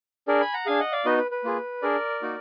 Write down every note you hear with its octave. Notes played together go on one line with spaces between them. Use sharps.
D4 G#4 A#4 D5
G#5 B5
F#5 A#5
D4 G#4 F5 G#5
D#5 F#5
D5 F5
B3 D#4 F#4 B4 D#5
B4
B4
A#3 F4 G#4
D4 G#4 A#4 D5
A#3 D#4 F#4